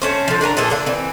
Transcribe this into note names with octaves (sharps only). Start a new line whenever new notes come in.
A3 C#4 C5
D3 F3
D4 A#4 G#5 A#5
A#2 E3 G#4 A4
D3 D4 F5
E3 C4